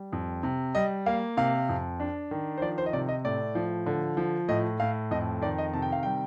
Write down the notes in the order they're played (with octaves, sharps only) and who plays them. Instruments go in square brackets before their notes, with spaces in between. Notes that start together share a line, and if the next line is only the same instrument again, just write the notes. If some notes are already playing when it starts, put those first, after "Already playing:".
Already playing: [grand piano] G3
F2
C3
G3 D#5
A#3 F5
C3 F5
F2
D4
D#3
C5
F3 D5
C5
D#5
C3 D5
D#5
A2 D5
F3
D3
F3
A2 D#5
A2 F5
F2 D#5
D#3 D5
D#5
C3 A5
G5
F5
G3 G5